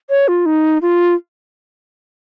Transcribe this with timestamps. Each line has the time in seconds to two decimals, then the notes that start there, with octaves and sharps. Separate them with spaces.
0.10 C#5
0.28 F4
0.46 D#4
0.82 F4